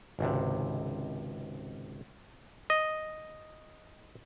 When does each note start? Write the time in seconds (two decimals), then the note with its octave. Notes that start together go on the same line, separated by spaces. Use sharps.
0.19 G#1 C#2 C3
2.70 D#5